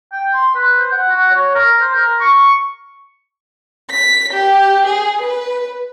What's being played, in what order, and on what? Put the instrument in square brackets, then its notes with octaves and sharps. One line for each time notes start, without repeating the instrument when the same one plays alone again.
[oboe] G5
C6
B4
C5
F#5
F#4
C#5
A#4
C5
A#4
C#6
[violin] B6
G4
G#4
B4